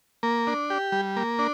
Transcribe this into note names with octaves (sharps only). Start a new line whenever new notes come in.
A#3
D4
G4
G3
A#3
D4